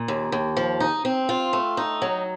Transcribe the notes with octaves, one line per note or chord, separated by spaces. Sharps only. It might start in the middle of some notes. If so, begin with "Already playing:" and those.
Already playing: A#2
D#2
D#2
F3
D#4
C4
F4
A3
D#4
F#3